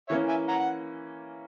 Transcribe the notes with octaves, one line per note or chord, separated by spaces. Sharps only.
E3 A#3 C#4 C#5 E5
E5 G#5
F#5 A#5
F#5